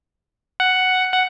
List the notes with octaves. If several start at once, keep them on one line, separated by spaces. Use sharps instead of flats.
F#5
F#5